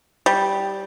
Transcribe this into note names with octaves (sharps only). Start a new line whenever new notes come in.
G3